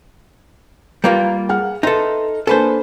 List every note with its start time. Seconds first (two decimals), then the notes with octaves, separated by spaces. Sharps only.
1.04 G3 A#3 F4 B4
1.49 G#4 F#5 F6
1.83 D#4 A4 B4 E5 C6
2.47 A#3 D4 A4 B4 C5 G#5